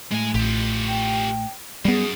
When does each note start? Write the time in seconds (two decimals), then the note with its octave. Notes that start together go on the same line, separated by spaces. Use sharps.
0.11 A2 G#3 G#5
0.35 A1 F4 G4
0.87 G5
1.85 F#2 G3 B3 G#4